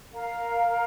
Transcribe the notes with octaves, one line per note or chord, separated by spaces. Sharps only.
A#4 F5 A#5